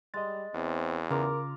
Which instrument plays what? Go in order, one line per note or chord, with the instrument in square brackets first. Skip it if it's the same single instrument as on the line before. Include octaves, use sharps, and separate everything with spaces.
[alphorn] G3 [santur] G#3 [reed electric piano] D#5 A6
[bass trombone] E2 [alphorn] C4
[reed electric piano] C#3 [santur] F4 A#5 D6 [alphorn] A#4